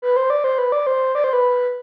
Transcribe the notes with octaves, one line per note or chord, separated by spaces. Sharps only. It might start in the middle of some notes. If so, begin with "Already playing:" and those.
B4
C5
D5
C5
B4
D5
C5
D5
C5
B4